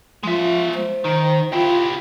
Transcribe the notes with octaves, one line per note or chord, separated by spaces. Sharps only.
F3 G#3 E5
C5
D#3
E4 F4 G4